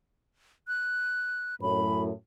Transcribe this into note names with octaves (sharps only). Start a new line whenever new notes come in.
F#6
F#2 A2 B5